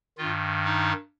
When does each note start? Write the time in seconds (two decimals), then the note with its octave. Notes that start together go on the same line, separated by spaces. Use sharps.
0.18 G2 D#3 F4
0.65 D#4